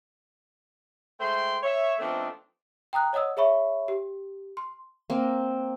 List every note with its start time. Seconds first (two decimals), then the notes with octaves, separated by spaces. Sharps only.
1.20 G#3 A3 C5 G5 C6
1.63 C#5 E5
1.99 F3 A3 B3 C4 D4 D#4
2.93 G5 A#5 D#6 F#6
3.13 C#5 D#5 F#5 D#6 E6
3.37 G#4 C#5 E5 B5 C#6
3.88 G4
4.57 C6
5.10 A#3 C4